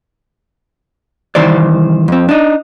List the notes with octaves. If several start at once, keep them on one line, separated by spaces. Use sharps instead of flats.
C2 D#3 E3 C5 D5
F2 C4
D4 D#4